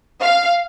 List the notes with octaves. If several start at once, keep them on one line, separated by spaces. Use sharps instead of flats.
F5